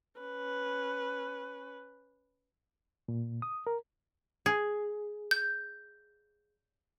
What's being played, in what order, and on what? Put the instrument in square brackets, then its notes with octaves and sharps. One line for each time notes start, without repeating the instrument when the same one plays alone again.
[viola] C#4 B4
[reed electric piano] A#2
D#6
A#4
[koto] G#4
[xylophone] G6